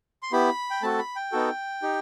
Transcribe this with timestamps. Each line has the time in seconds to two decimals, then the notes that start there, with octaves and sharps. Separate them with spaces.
0.23 C6
0.32 B3 E4 G4 B5
0.70 G5
0.82 A3 C4 F#4 A4 A5
0.99 B5
1.16 G5
1.32 B3 D#4 F#4 A4
1.82 D#4 G4